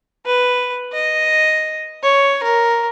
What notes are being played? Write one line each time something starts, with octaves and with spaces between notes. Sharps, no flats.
B4
D#5
C#5
A#4